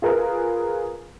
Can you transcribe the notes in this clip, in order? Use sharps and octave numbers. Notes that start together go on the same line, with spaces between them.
F4 G#4 A#4 B4